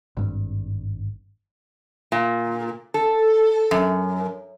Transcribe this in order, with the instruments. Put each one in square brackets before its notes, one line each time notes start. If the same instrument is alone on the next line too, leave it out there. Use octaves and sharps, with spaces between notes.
[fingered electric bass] G#1 G2
[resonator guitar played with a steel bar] A#2
A4
F#2